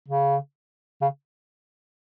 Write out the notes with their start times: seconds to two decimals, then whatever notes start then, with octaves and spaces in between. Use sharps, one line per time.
0.08 C#3
1.01 C#3